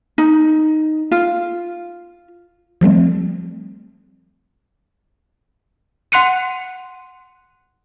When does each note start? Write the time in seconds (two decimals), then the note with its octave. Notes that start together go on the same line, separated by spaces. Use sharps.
0.18 D#4
1.12 F4
2.81 F3 G3 A3 C4
6.12 F#5 C6 F#6 C#7 D#7